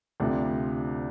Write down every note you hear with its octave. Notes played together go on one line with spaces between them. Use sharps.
D2 C3 F3 D4